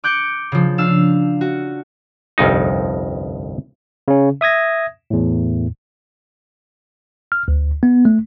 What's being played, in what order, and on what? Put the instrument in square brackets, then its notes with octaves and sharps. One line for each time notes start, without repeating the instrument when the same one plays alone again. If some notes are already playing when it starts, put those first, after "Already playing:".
[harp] D6 F#6 G6 C#7 D7
C#3 F3
D4 F5 E6 E7
F#4
[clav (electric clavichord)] G1 C2 F2 D#4
[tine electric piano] C#3 C#4
E5 D#6 G#6 A#6
E2 A2
F6
D2
B3
A3